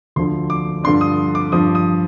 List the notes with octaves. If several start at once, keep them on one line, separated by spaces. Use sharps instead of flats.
D2 D3 F3 C6
D6
G2 D3 F3 C6
D#6
D6
G2 F3 D#6
D#6